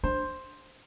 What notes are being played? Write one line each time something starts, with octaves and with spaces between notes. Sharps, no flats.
D4 C5